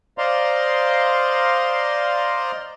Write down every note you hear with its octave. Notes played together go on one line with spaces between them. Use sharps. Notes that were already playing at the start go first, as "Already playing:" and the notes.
C5 D5 D#5 F5 A#5 C6